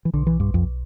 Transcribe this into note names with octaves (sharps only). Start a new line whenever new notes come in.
E3
B1 D3
E3
B1 G2
F2